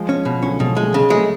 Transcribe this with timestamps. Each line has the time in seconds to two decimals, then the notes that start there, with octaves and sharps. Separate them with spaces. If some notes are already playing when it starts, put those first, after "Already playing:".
Already playing: F3 G#3
0.09 C#4
0.25 B2
0.39 F3
0.43 D3 F#3 C#4
0.56 F#3
0.59 B2 F3 G#3
0.76 F#3 G#3 A3
0.94 C#3
1.10 F#3 G#3 A3